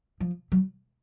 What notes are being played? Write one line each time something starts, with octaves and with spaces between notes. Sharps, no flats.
F3
F#3